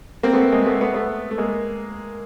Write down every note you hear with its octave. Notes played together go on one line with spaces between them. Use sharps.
A#3 C4
A3 B3
G#3 A#3
A3 B3
A3 B3
A3 B3
A3
G#3 A#3